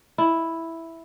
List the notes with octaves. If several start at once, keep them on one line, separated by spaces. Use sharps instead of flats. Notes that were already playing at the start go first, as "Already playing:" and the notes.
E4